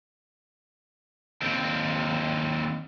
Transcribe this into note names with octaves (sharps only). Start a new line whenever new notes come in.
D#2 C4